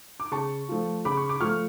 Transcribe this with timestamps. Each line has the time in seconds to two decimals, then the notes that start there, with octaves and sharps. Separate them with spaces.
0.20 D6
0.31 C#3 A5 C#6
0.69 F3 A3 F4
1.05 C#3 B5 D6
1.17 C#6
1.29 D6
1.40 F3 A3 F4 C#6 F6